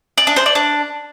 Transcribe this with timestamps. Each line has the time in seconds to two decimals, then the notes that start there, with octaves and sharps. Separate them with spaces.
0.18 D5
0.27 D4
0.36 C5
0.46 D5
0.55 D4